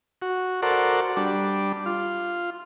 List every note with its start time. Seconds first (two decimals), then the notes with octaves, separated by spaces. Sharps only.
0.22 F#4
0.62 F#4 A4 A#4 C5 D5 F#5
1.17 G3 D4
1.86 F4